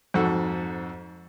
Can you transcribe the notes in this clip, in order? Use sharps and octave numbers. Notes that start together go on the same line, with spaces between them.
F2 G#2 F#4 A4